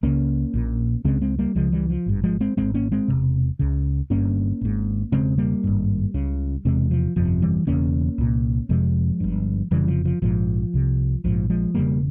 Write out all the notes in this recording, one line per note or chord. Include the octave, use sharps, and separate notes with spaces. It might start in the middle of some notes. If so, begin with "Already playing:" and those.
C#2 C#3 A#3 C#4
A#1 A#2
C#2 C#3 G#3 C4
G#3 C4
G3 A#3
C#2 C#3 F3 G#3
E3 G3
F3
G#1 G2
F3 G#3
G#3 C4
G#1 G2 G#3 C4
A#3 C#4
G#3 C4
E1 E2 C3
C#2 C#3
G1 G2 A#3 C#4
G#1 G#2
E1 E2 C#3 G#3 C4
G3 A#3
G#1 G2
C#2 C#3
E1 E2 C3 G#3 C4
F3
G1 F2 C3 F3
E3 G3
E1 E2 C#3 A#3 C#4
C2 A#2
F1 F2 C3 F3 G#3
G1 G2
F1 F2 C#3 E3 G3
F3
F3
A#1 G#2 F3
C2 C3
A#1 G#2 F3
F3 G#3
E1 E2 C#3 G3 A#3